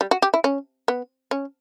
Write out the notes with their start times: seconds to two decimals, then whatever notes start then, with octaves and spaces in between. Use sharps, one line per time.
0.01 G3
0.11 F#4
0.22 G4
0.34 E4
0.44 C#4
0.88 B3
1.31 C#4